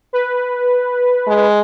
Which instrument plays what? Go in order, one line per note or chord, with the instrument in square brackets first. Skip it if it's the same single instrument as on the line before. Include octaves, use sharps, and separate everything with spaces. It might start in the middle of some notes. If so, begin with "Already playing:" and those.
[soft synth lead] B4
[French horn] G#3